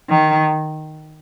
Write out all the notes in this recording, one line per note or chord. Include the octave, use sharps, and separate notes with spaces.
D#3